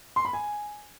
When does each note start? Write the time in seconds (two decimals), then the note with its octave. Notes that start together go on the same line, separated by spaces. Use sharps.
0.16 C6
0.25 B5
0.33 G#5